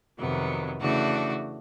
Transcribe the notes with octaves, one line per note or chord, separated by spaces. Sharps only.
F2 C3 D#3 F#3 B3
C#3 E3 A3 D4 F#4